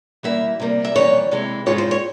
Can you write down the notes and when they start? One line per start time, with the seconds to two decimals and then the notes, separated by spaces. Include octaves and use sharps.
0.23 E3 G3 A#3 E4 E5
0.60 C3 G3 A#3
0.85 E5
0.95 F2 E3 G3 A#3 C#5
1.31 C3 E3 G#3 E4
1.66 G#2 E3 G#3 C4 F4 C#5
1.78 C5
1.91 C#5